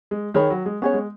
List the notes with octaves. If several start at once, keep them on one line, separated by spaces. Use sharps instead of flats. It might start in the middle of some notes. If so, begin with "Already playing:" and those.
G#3
D#3 G#4 C#5 B5
F#3
G#3
B3 C#4 G#4 C#5
G#3